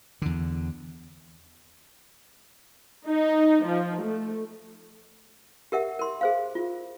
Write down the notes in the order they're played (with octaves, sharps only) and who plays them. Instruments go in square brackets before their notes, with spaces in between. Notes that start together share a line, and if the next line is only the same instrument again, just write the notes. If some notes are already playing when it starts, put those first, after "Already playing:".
[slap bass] E2 D3
[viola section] D#4
F3
A3
[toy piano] G4 A#4 E5 F#5
A#4 C6
G#4 C5 F5
F4